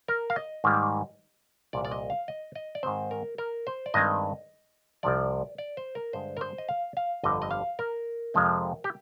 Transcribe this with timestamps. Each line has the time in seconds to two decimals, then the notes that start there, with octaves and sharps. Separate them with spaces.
0.08 A#4
0.30 F5
0.36 D#5
0.64 G#2 D#3 G3 A#3
1.73 C2 A#2 F3 A#3 D5
1.85 D5
1.91 D#5
2.10 F5
2.28 D#5
2.55 D#5
2.75 D5
2.83 G#2 D#3 G#3 C4 C5
3.11 A#4
3.38 A#4
3.67 C5
3.86 D5
3.94 G2 D#3 G#3 C4 D#5
5.03 C2 C3 F3 D5
5.58 D5
5.77 C5
5.95 A#4
6.13 G2 D3 G#3 C5
6.37 A#4
6.41 C5
6.58 D#5
6.69 F5
6.97 F5
7.23 G1 F2 D3 G3 D#5
7.42 D#5
7.51 F5
7.79 A#4
8.34 F2 C3 F3 G#3 C4
8.84 G4